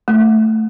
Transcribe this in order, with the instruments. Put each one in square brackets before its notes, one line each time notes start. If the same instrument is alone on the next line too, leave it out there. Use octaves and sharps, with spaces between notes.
[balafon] A3